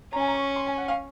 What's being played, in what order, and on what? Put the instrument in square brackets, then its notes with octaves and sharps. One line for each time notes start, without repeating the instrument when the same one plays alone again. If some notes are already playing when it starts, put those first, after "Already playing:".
[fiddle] C#4 [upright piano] A#5
[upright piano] G#5
A#5
C#6
C6
G#5
F#5
F5